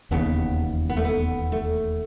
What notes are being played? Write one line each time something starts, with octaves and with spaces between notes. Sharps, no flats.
E1 D#2 C#3 B3
B3
A3
B3
A3